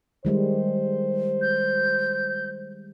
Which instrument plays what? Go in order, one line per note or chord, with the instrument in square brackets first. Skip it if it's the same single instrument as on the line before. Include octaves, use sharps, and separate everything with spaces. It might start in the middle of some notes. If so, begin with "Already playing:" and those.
[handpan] D#3 G3 G#3 [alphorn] C5
[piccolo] G6